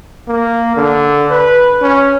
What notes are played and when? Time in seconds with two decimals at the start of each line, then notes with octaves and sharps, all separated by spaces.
0.28 A#3
0.77 D3
1.31 B4
1.82 C#4